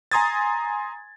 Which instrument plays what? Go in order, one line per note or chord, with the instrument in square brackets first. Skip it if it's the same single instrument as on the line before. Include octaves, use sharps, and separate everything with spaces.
[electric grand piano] G#5 A#5 C6 D#6 G#6 A6